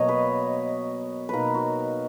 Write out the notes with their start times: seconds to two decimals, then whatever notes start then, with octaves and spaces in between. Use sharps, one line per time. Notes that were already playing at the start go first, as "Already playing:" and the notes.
Already playing: B2 F#3 A#3 C#5 D#5
0.09 B4
1.29 B2 A#3 D#4 A#4 B4
1.54 F#4